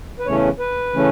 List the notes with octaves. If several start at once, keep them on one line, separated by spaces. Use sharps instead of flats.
B4
E2 C#3 E3 A3 C#4 C#5
B4
C#3 E3 A3 C#4